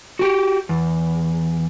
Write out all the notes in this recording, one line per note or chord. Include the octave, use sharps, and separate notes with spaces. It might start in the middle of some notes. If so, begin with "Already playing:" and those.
F#4 G4
E2